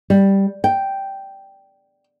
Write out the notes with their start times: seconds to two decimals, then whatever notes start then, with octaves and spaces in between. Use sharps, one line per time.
0.10 G3
0.64 G5